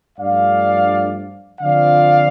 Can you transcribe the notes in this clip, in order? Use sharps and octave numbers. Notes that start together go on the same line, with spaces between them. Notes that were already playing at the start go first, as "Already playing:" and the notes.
G2 F3 A3 D4 D5 F5
D3 F3 C4 F4 D5 F5